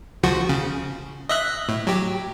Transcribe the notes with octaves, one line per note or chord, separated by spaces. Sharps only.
C#2 F3 F#4
C#3
D#5 E5 F#6
A2
F#3 G4